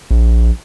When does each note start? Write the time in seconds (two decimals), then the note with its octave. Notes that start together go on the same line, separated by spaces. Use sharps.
0.11 A#1